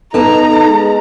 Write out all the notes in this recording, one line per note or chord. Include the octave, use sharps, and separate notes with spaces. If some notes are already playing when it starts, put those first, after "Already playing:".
B3 D#4 A4 B4 A5 A#5
G#3